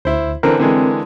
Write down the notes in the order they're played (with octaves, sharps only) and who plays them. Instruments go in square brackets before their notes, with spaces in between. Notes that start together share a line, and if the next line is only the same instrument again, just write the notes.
[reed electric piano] D2 [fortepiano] E4 C5
[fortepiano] D3 E3 C4 [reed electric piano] A#4
[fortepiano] D3 E3 G#3 [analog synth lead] C4